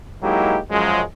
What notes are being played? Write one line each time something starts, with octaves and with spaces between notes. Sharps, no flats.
F#3 G#3 A#3 D#4 E4 G4
F#2 F3 G#3